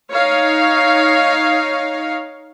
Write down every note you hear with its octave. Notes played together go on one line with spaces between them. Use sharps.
D#4 C#5 F5